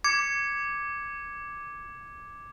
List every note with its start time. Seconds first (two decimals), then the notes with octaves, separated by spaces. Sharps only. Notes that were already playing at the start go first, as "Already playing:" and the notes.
0.04 D6 G#6 C#7